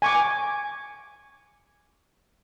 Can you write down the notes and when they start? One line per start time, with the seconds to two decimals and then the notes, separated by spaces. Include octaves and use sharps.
0.02 G#5 C#6 D6